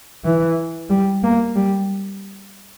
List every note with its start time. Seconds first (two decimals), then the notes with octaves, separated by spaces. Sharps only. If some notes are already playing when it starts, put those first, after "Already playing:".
0.25 E3
0.89 G3
1.23 A#3
1.56 G3